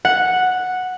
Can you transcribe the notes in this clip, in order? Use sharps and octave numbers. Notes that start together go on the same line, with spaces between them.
F#5